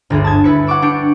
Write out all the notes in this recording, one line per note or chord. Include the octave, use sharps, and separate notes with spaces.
G1 D2 G#4
A5 D#6 G#6
E4 B4 C#7
F#5 C#6 D6 E6
D4 G4 C#7 D7